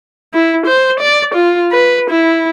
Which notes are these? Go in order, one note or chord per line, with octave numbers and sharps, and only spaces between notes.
E4
C5
D5
F4
B4
E4